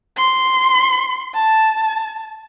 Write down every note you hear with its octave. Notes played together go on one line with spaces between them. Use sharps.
C6
A5